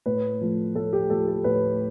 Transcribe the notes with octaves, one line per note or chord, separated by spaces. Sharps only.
A2 B4
F3 A3
A2 A4
G4
F3 A3 A4
A4
A2 B4